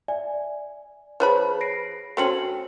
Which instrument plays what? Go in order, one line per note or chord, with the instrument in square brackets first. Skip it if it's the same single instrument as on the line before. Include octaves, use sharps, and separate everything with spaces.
[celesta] D5 E5 G#5
[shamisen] F3 B4 B5 [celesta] G#4 C#5
[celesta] A#6 C7 D7
[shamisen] A3 C4 C#4 [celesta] F#4 C#7 F#7